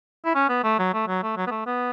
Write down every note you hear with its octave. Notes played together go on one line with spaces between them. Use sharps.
E4
C#4
B3
A3
F#3
A3
F#3
A3
F#3
B3
A3
B3